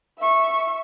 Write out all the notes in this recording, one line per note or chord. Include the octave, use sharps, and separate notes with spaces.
E5 C#6